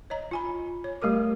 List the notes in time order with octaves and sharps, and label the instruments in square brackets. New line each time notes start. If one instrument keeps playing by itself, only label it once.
[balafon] C#5 D#5 A#5
F4 G#5 B5
C#5
G3 A3 G4 A#4 D6